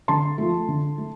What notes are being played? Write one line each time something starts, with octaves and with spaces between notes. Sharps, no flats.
D3 A5 C6
F3 A3
D3
A3